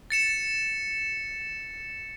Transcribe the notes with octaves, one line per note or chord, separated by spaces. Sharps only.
A6 C#7 E7